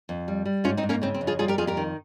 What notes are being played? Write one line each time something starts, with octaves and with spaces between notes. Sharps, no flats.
F2
G3
G3
G#2 C#4 F4
C4 D#4
G#2
A#3 C#4
C#3 C4
C4
F2
F4 G#4
G3 F4 G#4
G4 A#4
F2 F4 G#4
G4 A#4
D#3